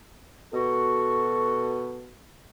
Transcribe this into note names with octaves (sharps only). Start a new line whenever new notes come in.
B2 F#4 A4